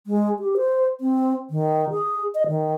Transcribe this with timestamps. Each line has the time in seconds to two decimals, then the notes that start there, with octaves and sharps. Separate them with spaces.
0.07 G#3
0.39 G4
0.57 C5
1.01 C4
1.50 D#3
1.91 G#4
2.35 D#5
2.47 D#3